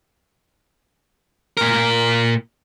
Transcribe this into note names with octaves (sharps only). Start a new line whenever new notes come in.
A#2 A#4